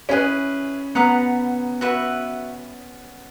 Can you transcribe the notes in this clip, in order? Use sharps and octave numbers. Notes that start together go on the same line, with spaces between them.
C#4 E4 G#4 B4
B3 B4 F#5 A#5 D#6
F#4 B4 E5